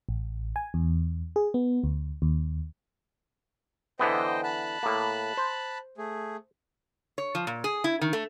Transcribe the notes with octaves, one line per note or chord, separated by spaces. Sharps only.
A1
G#5
E2
G#4
B3
D2
D#2
D3 E3 B3 C5 D#5 G5
A5 B5 F#6
A2 A#3
C5
A3 G#4
C#5
F3
A#2
G#4
E4
D#3
A3